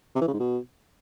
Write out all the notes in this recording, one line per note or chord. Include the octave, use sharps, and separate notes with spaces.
C3
E3
C#3
G#2
B2